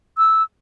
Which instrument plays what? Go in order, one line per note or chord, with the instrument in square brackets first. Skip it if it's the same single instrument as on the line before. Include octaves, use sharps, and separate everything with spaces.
[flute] E6